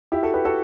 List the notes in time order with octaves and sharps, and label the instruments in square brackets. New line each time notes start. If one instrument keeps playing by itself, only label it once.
[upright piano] E4 G4
F#4 A4
G4 B4
F#4 A4